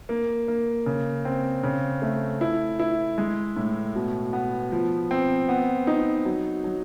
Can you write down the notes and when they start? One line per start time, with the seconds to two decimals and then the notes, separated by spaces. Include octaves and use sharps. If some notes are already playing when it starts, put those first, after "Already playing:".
0.09 A#3
0.48 A#3
0.86 C#3
1.25 C4
1.63 C#3
2.02 A3
2.41 E4
2.79 E4
3.18 G#3
3.56 A2
3.95 B2
4.33 B3
4.72 F3
5.11 C4
5.49 B3
5.87 D#4
6.25 F#3
6.64 F#3